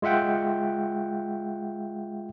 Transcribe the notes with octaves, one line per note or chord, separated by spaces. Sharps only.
G#3 F4 E5 F#5 G5